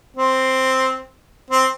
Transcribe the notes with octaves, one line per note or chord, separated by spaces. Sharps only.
C4
C4